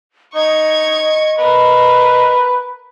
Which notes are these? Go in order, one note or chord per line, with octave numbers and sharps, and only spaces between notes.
D#4 D#5 C#6 G#6
A#4 B4